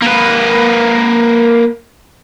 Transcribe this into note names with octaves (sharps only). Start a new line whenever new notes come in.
A#3 B4